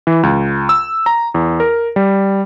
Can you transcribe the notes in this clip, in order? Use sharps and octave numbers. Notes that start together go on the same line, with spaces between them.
E3
C#2
E6
A#5
E2
A#4
G3